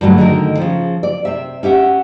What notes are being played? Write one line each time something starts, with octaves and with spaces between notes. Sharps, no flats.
G2 D3 F#3 G3 A3
D3 D#3 A3 D#4 A#4
C#3 F3
D5
C3 E5
C#4 G4 E5 F#5